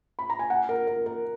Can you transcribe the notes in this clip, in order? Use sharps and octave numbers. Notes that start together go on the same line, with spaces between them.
B5
A#5
G#5
F#5
A#4
A#4
A#4